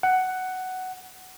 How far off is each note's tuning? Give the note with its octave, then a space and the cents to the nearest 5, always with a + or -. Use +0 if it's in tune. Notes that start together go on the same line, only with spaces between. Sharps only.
F#5 +10